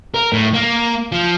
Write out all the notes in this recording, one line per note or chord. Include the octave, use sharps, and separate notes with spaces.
A#4
A2
A#3
F3